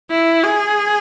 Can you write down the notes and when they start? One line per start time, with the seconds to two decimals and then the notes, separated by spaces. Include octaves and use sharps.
0.11 E4
0.44 G#4